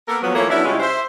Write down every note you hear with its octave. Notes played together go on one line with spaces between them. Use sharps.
A#3 B3 A4 A#4
F3 F#3 B3
E3 F3 A3 A#3 C#5
F#3 B3 C#4 D4 E4
C#3 G3 G#3 C#4 E4 F4
C5 E5